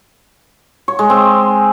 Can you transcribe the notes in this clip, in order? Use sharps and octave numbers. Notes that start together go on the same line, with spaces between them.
C#5
G#3
C4